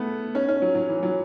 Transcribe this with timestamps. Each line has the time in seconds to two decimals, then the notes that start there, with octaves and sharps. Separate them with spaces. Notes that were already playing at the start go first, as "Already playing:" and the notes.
Already playing: A3 B3
0.35 C#4
0.48 C#4
0.62 F#3
0.75 F#3
0.89 E3
1.03 F#3